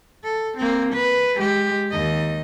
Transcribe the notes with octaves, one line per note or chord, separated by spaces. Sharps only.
A4
A#3 C4
B4
G#3 G4
D#2 D#5